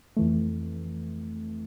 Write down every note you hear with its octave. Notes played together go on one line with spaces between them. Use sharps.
F2 E3 A3